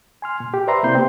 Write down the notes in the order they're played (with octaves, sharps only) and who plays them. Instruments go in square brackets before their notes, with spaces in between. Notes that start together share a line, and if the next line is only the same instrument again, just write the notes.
[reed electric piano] G#5 C6 F6
A#2
G4
B4 C5 D5 E5 A#5 C6
C3 A#3 C4 E4 C6 G6
C4 G4